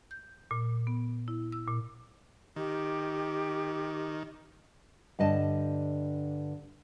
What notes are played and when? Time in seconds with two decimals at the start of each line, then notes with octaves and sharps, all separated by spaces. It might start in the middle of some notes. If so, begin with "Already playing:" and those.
0.11 G6
0.51 A#2
0.87 B3
1.28 E4
1.52 E6
1.68 A#2
2.56 D#3 G4
5.19 G2 D3 D#5 A5